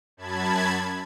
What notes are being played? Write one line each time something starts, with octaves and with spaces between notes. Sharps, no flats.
F#2 A5 B5 G#6